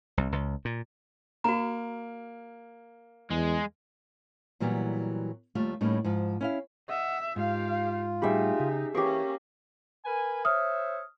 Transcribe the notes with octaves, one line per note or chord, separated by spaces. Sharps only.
C2
C#2
A#2
A#3 F#4 A#5
E2 G#3
A#2 E3 F#3 G3 B3
D#2 G3 A3 F4
A2 G3 A#3 C#4 D#4
G#2 F3
C#4 E4 F5
D#5 E5 F#5 D#6
G#2 F4 G4 F5
A2 G3 D#4 G4 G#4 E5 B5
C#3
E3 A#3 C#4 G4 G#4 A#4 C#6
A#4 B4 G#5
C5 C#5 E5 D#6 F6